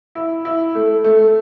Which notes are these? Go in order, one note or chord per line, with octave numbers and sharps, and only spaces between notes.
E4
E4
A3
A3